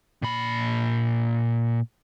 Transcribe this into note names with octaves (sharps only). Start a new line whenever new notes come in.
A#2 B5